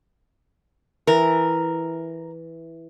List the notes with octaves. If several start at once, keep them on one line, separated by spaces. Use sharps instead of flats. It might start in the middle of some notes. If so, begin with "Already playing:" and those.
E3 A#4